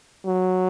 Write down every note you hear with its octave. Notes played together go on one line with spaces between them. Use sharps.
F#3